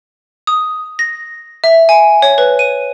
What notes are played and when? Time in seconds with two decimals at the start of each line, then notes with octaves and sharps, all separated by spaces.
0.47 D#6
0.99 A#6
1.64 E5
1.89 G#5
2.22 C#5
2.38 B4
2.59 D#7